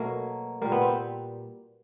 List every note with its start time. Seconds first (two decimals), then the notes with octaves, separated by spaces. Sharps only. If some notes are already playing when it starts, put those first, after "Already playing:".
Already playing: B2 F#3 A3 A#3
0.62 A#2 G3 A#3
0.72 B3
0.81 C4